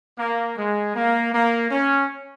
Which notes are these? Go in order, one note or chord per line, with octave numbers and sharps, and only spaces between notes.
A#3
G#3
A#3
A#3
C#4